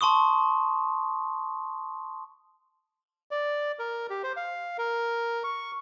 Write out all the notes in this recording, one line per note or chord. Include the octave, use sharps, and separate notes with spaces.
A5 C6 C#6 D#6
D5
A#4
G4
C5
F5
A#4
C#6